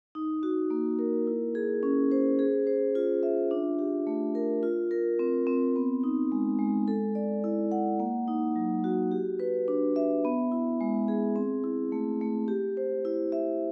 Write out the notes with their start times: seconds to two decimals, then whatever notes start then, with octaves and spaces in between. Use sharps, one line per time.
0.15 D#4
0.43 F#4
0.70 A#3
0.99 A#4
1.27 E4
1.55 G#4
1.83 C#4
2.11 C5
2.39 G#4
2.67 C5
2.95 F4
3.23 E5
3.51 D4
3.79 G4
4.07 A3
4.35 A#4
4.63 F4
4.91 A#4
5.19 C4
5.47 C4
5.76 B3
6.04 D#4
6.32 G#3
6.59 G#3
6.88 A4
7.15 D5
7.44 E4
7.72 F#5
8.00 A#3
8.28 D#4
8.56 F#3
8.84 F#4
9.12 G4
9.40 B4
9.68 D4
9.96 E5
10.25 B3
10.52 E4
10.81 G#3
11.08 G#4
11.36 C4
11.64 E4
11.92 A3
12.21 A3
12.48 G4
12.77 C5
13.05 E4
13.32 E5